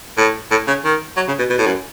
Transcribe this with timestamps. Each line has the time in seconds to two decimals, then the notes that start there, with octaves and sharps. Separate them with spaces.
0.18 A2
0.51 A2
0.68 C#3
0.85 D#3
1.17 F#3
1.28 C#3
1.39 B2
1.50 B2
1.58 A2
1.67 F#2